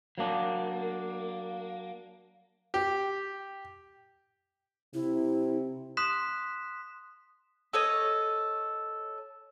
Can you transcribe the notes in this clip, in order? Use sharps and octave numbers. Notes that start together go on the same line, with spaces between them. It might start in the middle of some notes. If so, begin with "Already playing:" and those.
F#3 A#3 D4
G4
C3 E4
C6 D#6 F#6 B6 E7
A4 C#5 D#5